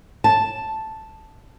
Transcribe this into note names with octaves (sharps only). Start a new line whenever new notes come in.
A5